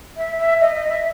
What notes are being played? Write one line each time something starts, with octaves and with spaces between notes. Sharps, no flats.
E5
E5
D#5
D#5
E5